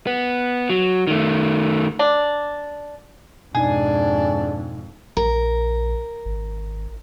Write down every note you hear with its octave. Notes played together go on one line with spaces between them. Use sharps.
B3
F#3
D#3 A3
D4
F2 G#2 B2 D4 D#4 G#4
A#1 A#4
G#1